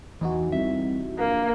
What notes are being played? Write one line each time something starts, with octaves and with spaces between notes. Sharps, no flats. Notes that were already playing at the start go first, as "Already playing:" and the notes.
E2 E3 D#4 F#4
C2 E5
A#1 A#3